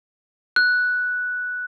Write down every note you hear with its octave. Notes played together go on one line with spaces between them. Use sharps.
F#6